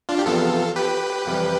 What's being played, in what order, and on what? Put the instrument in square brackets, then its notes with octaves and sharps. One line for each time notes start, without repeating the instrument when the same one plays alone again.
[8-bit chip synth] D4 F4
G4
[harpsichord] E2 C3 F3 B3 D4 [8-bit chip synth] F4 A4
[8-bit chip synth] G4 B4
[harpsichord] F2 C3 E3 G3